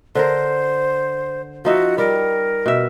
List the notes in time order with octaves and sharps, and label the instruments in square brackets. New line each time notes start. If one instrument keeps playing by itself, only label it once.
[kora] D3 A#4 [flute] C5
[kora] F3 D#4 E5 [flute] F#4
[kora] G3 [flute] A#4
[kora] B2 E5